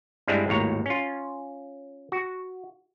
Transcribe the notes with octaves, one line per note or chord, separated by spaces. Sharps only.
G2 G3 G#3 C4 D4 E4
G#1 D#2 A2 C#5 A#5
C#4 F4
F#4